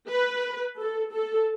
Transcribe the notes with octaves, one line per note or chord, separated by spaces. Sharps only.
B4
A4
A4